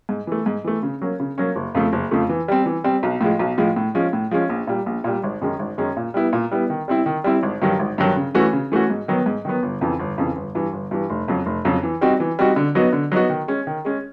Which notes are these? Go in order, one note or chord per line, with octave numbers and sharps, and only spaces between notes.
G#2
E3 A3
G#2
E3 A3
C#3
F#3 A#3 C#4
C#3
F#3 A#3 C#4
F#1
F2 C#3 F3 A3
F#1
F2 C#3 F3 A3
E3
G3 C4
E3
G3 C4
B1
A2 F3 G#3
B1
A2 F3 G#3
A2
F3 G#3 C#4
A2
F3 G#3 C#4
A#1
A#2 G3
A#1
A#2 G3
G#1
F#2 D#3 G#3 C#4
G#1
F#2 D#3 G#3 C#4
A#2
G3 B3 E4
A#2
G3 B3 E4
D#3
G3 C4 E4
D#3
G3 C4 E4
G#1
G2 D#3 F#3
G#1
G2 D#3 F#3
C#3
E3 A3 C#4 F#4
C#3
E3 A3 C#4 F#4
G#2
D#3 F#3 B3
G#2
D#3 F#3 B3
G1
F2 C#3 E3
G1
F2 C#3 E3
G1
G2 E3
G1
G2 E3
F1
F2 C#3 F#3
F1
F2 C#3 F#3
E3
G3 C4 D#4 F#4
E3
G3 C4 D#4 F#4
D3
F#3 B3 D#4 F#4
D3
F#3 B3 D#4 F#4
D#3
G#3 C#4
D#3
G#3 C#4